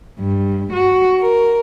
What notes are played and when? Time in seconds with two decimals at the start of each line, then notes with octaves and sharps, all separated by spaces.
0.19 G2
0.72 F#4
1.21 A#4